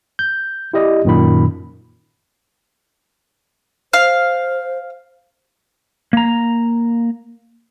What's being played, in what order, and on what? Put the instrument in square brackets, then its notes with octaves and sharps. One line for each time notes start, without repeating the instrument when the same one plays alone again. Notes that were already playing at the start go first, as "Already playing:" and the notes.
[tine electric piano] G6
E4 G4 D5 D#5
F#2 A#2 D#3 B5
[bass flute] C5 [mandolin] F5
[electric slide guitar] A#3 A#5